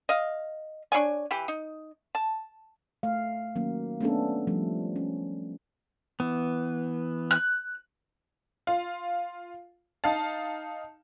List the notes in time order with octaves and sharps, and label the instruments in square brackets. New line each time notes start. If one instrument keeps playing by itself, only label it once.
[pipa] D#5 F5
D4 F4 C#5 G#5
E3 G4
D#4
A5
[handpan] A3 F5
D#3 F#3 A#3 C#4
A3 B3 C#4 D4 A4
F3 G3 A3
C#4
[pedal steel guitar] E3 B3
[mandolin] F#6
[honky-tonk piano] F4
D#4 F5 A5